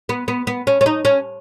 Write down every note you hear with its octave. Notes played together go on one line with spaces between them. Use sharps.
B3
B3
B3
C#4
C#4
D#4
C#4